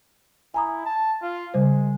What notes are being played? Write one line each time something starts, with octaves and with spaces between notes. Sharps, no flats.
E4 G#5 A#5 D#6
A5
F4
C#3 G3 G#3 C5